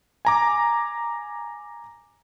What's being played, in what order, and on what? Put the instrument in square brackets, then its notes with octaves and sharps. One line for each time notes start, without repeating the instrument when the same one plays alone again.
[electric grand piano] G#5 A#5 D6